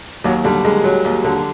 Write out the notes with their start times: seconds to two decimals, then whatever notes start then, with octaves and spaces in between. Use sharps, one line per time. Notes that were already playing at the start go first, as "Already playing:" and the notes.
0.24 D#2 F#3
0.44 D3 G3
0.64 D#2 G#3
0.84 F#3
1.05 D#2
1.24 D3